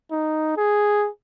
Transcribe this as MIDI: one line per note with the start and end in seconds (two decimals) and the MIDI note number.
0.12 0.54 63
0.57 1.08 68